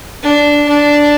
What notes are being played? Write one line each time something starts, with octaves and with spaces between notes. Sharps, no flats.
D4
D4